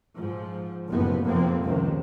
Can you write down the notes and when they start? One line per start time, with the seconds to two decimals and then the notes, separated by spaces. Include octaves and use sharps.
0.17 G#2 F3
0.90 F#1 A2 C3 F3 B3
1.25 F1 F2 C3 F3 A#3 C4
1.63 C#2 C3 D#3